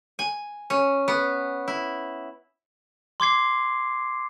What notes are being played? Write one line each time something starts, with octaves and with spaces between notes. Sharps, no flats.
G#5
C#4
B3
E4
C6 D6 G#6 C7